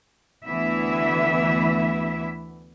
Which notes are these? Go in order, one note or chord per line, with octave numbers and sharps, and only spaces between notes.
D2 E3 B3 E4 E5